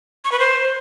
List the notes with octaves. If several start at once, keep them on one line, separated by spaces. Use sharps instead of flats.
C#6
B4
C5